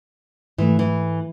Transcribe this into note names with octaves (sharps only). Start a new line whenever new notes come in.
G#2 E3 A3
E3